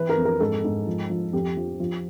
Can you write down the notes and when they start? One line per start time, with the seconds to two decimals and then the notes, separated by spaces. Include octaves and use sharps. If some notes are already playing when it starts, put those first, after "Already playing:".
Already playing: E3 B4
0.09 A#4
0.17 F2
0.25 A#4
0.40 G#2 A4
0.64 G#2
0.87 F3
1.10 F3
1.33 F2 G4
1.57 F3
1.80 F3